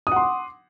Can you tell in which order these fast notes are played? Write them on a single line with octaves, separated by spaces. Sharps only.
D#6 F#5 C6 D6